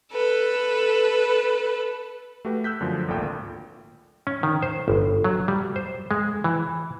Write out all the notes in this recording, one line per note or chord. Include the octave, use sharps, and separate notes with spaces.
A4 B4
A3 F#4 G4 B4
E6 F#6 G6 B6
F#2 D3 F3
G#1 D2 A#2 A4 G5
C#4
D#3
C5
G1
F#3
G3
C5
G#3
E3